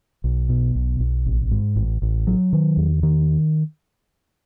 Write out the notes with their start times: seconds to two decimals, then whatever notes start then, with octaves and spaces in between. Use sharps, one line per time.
0.24 B1
0.49 B2
0.75 B1
0.99 B1
1.26 A1
1.51 G#2
1.76 A1
2.02 A1
2.27 F#3
2.53 D#3
2.77 E2
3.03 D#3